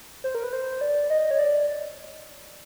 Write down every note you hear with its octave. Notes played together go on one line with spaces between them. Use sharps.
C5
A#4
B4
C5
D5
D#5
C#5
D5